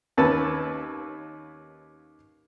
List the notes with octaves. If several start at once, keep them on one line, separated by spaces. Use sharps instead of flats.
D#2 A#3 C#4 B4 A5 E6